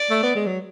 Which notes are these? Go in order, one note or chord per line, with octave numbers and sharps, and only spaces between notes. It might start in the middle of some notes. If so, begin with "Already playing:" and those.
Already playing: D5
A3
B3
G#3
F#3